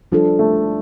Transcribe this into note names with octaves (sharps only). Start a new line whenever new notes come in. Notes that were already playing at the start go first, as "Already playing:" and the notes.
F3 G3 D4 A4
A3